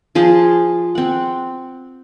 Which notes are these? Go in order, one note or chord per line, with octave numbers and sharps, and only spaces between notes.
F3 G#4 C5 A5
C4 F#5